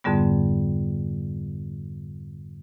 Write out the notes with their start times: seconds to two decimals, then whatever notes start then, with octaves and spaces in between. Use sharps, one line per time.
0.04 F2 G#2 D3 G3 B3